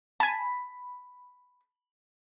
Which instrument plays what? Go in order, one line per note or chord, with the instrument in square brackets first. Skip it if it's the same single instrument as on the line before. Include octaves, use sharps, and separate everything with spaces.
[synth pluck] G#5 A5 [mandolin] B5